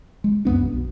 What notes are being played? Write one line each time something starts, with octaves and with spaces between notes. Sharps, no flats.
G#3
C2 F#2 B3 D4
B1 B2